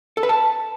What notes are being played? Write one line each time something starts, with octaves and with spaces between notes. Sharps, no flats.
A4
B4
A5